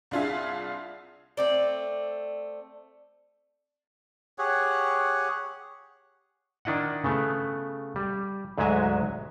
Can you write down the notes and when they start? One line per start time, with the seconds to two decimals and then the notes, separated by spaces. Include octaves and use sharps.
0.11 C2 D4 F4 G#4 E5
1.37 A3 C4 D5
4.38 G4 G#4 C#5 F#5
6.65 D#3 D4 E4 D#5 F#5
7.04 C#3 A3 B3
7.96 G3
8.58 D2 G#2 F#3 G#3 E5 G#5